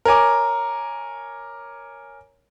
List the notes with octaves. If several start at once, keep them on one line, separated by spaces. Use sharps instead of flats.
A#4 C#5 G#5 D6